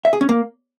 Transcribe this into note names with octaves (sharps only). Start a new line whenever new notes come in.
E5
G#4
C#4
A#3